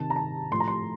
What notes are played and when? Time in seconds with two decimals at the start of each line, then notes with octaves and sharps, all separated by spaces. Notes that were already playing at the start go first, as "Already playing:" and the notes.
Already playing: C3 D#3 A5
0.10 A#5
0.16 A5
0.51 A2 F3 C6
0.60 A#5
0.68 C6